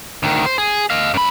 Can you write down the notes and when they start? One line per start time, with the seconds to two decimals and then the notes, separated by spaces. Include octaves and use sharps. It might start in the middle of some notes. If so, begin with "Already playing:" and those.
0.23 D2 D#3
0.46 C5
0.58 G#4
0.90 D#5 F5
1.14 F#2 B5